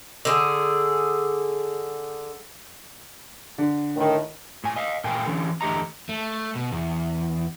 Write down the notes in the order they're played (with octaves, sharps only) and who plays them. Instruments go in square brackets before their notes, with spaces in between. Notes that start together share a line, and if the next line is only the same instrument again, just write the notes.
[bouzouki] D3 G#4
[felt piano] D3
[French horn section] A2 D#3
[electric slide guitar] A2 G#5
D#5 F5
A#2 A3 A#4 F5 G5 G#5
D3 E3 C#4
E2 D3 A3 G4 D#5 A#5
A3
B2
E2